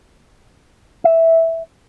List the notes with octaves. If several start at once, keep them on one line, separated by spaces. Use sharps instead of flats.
E5